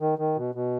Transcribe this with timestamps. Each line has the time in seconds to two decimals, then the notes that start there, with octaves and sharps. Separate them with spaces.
0.01 D#3
0.19 D#3
0.37 B2
0.55 B2